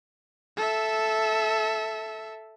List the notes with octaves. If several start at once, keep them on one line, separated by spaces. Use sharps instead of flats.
A4 E5